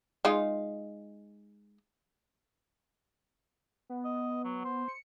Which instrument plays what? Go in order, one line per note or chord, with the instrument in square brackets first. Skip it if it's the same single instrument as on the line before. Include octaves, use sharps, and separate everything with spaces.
[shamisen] G#3 D#4 F4
[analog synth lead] B3
[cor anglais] D#5
F#3
C5
[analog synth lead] C#7